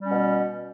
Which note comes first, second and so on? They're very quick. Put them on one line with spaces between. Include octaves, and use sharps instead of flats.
G3 C#4 B2